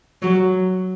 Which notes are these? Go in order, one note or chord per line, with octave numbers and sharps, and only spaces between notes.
F#3